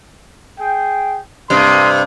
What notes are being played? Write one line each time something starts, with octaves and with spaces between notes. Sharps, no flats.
G#4 G5
G2 C3 A#3 C6 D#6